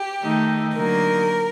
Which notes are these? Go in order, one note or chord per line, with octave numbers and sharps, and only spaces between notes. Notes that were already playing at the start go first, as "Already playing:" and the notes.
Already playing: G4
D#3 A3 D#4
D3 F#3 A#3 D#4 A#4